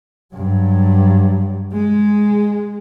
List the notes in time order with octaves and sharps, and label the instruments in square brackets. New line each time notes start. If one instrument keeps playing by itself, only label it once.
[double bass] G2 F#3
G#3